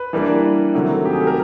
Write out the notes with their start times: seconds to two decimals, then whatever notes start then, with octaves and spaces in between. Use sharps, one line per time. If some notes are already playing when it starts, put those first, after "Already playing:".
Already playing: B4
0.13 E3 G3 A#3 D4
0.74 C3 D#3 F#3 A3
1.05 G4
1.13 G#4
1.20 A4
1.27 A#4